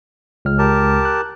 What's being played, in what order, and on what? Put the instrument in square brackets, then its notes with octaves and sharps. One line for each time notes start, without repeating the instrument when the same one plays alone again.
[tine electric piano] C#2 F6
[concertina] G4 A#4 A5
[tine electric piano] F#6